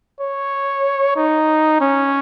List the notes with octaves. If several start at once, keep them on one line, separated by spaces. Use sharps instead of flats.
C#5
D#4
C#4